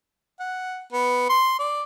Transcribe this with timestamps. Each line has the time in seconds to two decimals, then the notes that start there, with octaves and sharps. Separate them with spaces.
0.40 F#5
0.93 B3
1.29 C6
1.59 D5